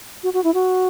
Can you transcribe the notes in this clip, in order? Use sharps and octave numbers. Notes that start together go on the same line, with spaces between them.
F#4
F#4
E4
F#4